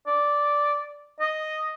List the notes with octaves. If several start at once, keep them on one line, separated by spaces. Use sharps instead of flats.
D5
D#5